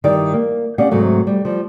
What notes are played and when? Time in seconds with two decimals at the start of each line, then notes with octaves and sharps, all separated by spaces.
0.04 G2 D#3 E4 G4 D5
0.33 A#3
0.78 B3 C#4 G4 D5 F5 F#5
0.91 G#2 C3 F#3 A3
1.27 G3
1.45 F3 G3